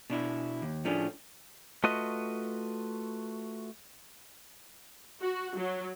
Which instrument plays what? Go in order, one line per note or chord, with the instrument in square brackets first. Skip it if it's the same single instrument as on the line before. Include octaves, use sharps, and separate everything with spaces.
[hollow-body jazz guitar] B2 D4 E4
D#2
A2 F3 A3 C#4 D4 G#4
[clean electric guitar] A3 F4 F#4 B4 D#5
[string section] F#4
F#3